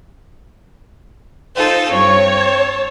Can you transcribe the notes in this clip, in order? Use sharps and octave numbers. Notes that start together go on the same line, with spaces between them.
D#4 F4 A4 C5
G2 C4 C#5
A5